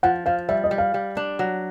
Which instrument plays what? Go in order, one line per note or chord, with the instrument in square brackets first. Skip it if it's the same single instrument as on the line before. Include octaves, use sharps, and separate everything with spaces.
[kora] F3 [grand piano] F#5
[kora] F3 [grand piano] F5
[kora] G3 [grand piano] E5
[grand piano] D#5
[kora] G3
[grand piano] F5
[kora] G3
D4
F#3